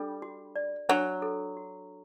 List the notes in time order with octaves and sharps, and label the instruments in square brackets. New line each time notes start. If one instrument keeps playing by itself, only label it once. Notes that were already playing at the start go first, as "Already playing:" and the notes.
Already playing: [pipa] G3 [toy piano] D4 A4
[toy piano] F#4
D5
[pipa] F#3 [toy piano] D4
[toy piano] A4
F#4